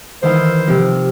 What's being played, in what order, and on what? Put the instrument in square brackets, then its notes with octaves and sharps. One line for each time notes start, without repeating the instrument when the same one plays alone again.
[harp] D#3 E3 F5 [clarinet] C5
[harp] C3 F3